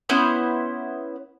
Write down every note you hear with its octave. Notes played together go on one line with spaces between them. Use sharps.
B3 C#4 E4 C5